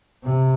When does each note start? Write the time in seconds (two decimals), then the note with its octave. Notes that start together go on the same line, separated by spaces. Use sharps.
0.24 C3